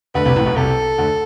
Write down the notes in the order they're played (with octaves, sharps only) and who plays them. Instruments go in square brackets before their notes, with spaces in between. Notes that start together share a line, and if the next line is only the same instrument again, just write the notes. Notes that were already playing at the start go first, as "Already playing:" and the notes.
[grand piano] D2 D3 [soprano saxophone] B4
[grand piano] C2 C3
A1 A2
B1 B2
[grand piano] C2 C3 [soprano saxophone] A4
[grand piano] D2 D3